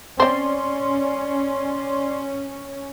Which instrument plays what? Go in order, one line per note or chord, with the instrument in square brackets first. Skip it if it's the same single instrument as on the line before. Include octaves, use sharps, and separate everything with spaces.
[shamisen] C4 C5 [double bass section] C#4 [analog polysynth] D5 C6